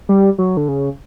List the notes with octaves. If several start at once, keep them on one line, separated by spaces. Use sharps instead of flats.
G3
F#3
D3
C#3